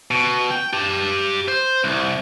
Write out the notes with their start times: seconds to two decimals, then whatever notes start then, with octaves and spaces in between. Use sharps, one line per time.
0.11 B2
0.51 G5
0.73 G4 A5
1.48 C5
1.84 C2